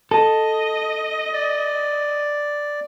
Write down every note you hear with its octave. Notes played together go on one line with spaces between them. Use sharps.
A4 D#5
D5